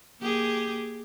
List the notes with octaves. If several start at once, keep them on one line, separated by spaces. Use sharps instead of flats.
A#3 G4 G#4